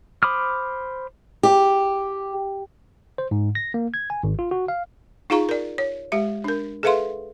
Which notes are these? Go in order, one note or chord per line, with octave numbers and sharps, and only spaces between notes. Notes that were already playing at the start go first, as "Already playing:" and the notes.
C5 B5 D6 D#6 F6
G4
C5
G#2
A#6
A#3
G#6
G#5
G#1
F4
F#4
F5
D#4 F4 G#4 F5 A#5 C#6
A#4 D5
C#5
G#3 G4 E5
D4 A#4
G#4 A4 B4 E5 F5 C6